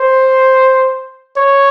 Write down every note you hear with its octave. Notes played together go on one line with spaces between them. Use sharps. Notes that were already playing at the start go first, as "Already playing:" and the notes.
Already playing: C5
C#5